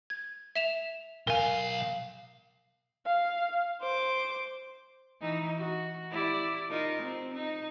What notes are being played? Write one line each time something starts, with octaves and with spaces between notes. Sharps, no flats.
G#6
E5 E7 F7
B1 A#4 F5 G#5
F5
C5 D6
E3 D#4
F#4
E4 G4 D5
D#4 F4 A#4
C4
D#4